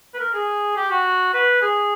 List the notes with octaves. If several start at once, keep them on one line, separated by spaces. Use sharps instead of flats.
B4
A#4
G#4
G4
F#4
B4
G#4